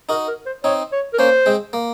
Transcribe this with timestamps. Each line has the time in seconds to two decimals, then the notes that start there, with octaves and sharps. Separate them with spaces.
0.09 D#4 F#4 A#4
0.28 A#4
0.46 C5
0.64 C4 D#4 C#5
0.92 C#5
1.13 A#4
1.19 A#3 C#4 C5
1.46 G#3 C4
1.73 A#3